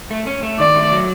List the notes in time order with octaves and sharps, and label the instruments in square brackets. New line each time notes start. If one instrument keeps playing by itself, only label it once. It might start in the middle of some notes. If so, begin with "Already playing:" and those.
[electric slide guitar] A3
C#4
A3
[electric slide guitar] D#3 [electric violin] D5
[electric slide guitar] A3
F#3